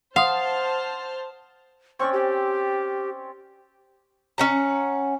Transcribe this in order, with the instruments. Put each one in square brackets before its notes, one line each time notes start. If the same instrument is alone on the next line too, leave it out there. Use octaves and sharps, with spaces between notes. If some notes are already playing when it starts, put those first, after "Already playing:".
[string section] C5 A5 F6 [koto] F5 [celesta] F#5 C6 D#6
[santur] C4 C#4 D5 [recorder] C#6
[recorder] G4
[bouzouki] C#4 F#5 A#5